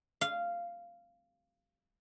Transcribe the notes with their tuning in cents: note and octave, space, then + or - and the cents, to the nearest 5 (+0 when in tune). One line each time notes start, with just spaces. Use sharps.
F5 -10